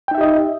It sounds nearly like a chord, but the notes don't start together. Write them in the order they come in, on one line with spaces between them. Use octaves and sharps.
G5 D#4 E5 G4 D#5